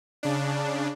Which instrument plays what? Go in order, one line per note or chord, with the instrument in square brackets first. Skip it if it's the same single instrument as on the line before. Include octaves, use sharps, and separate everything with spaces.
[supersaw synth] C#3 D4